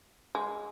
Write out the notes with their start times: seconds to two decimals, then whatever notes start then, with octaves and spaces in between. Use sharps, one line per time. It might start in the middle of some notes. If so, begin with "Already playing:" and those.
0.35 G#3